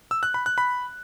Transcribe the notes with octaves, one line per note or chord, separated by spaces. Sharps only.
E6
F#6
B5
F#6
B5